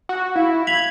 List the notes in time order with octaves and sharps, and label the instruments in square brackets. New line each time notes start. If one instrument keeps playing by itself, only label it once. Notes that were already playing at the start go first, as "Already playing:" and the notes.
[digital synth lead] F#4
[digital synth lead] E4 [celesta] F5
[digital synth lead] G#6 [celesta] B6 F7 F#7